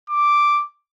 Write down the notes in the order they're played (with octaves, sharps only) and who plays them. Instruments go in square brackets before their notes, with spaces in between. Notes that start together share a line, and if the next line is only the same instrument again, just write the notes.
[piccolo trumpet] D6